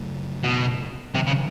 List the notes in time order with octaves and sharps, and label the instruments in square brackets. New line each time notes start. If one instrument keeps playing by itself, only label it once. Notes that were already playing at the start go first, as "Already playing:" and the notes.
Already playing: [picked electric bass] F#2 C#3 F#3 A3
[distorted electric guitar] B2
[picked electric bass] G2 D#3 F#3 [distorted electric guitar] C3
[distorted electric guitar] C#3